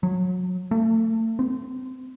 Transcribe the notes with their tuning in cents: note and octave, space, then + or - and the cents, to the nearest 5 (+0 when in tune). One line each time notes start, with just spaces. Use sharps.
F#3 -25
A3 +35
C4 -30